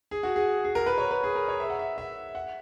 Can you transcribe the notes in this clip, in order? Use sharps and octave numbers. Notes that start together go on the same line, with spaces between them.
G#4
F#4
G#4
G#4
A#4
B4
C#5
B4
G#4
A#4
C#5
E5
F#5
E5
E5
F#5